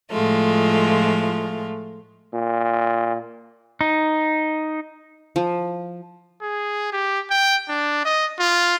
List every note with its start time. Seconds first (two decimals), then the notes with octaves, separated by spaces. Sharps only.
0.10 A2 F3 G#3 A3 F4
2.33 A#2
3.81 D#4
5.36 F3
6.42 G#4
6.93 G4
7.31 G5
7.69 D4
8.06 D#5
8.40 F4